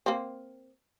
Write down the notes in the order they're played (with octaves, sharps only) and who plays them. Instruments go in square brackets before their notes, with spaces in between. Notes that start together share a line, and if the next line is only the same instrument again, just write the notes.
[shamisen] A#3 C4